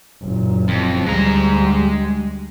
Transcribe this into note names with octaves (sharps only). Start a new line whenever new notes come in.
F#1 A#2
F2
D2 G3 G#3 A#5